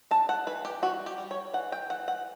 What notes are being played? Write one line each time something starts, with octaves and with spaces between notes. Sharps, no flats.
D4 A5
F#5
E3 B4
G4
G3 F#4
G4
G3
C#5
E3 F#5
G5
E3 F#5
F#5